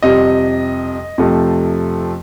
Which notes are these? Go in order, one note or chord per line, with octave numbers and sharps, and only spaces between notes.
F2 C3 G3 D#5
F2 C3 F3 A3